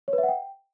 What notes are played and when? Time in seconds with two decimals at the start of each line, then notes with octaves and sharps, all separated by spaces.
0.08 C#5
0.13 B4
0.18 E5
0.23 F#5
0.28 G5